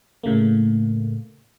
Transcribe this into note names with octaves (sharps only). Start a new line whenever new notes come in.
A2 C#3 A3 A#3